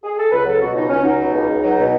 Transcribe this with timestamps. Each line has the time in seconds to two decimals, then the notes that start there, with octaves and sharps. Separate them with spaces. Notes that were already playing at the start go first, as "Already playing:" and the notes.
0.04 G#4
0.18 A4
0.31 C#2 B4
0.45 F#3 A4
0.60 B2 F#4
0.75 C#2 D#4
0.89 C#2 C#4
1.02 F#3 D#4
1.19 B2
1.34 C#2
1.48 C#2
1.63 F#3 D#4
1.78 B2